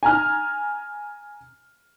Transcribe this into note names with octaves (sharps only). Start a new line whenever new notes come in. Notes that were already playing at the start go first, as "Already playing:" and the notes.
G#5 A#5 F6